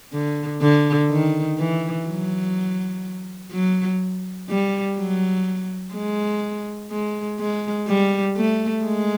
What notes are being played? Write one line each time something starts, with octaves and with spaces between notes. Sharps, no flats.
D3
D3
D#3
E3
F#3
F#3
G3
F#3
G#3
G#3
G#3
G3
A3
G#3